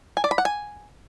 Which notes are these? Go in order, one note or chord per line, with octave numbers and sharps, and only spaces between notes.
G#5
D5
B5
F#5
G#5